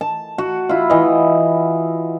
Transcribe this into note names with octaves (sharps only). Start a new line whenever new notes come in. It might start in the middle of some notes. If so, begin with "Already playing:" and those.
A5
F#4
E4 F4
E3 D#5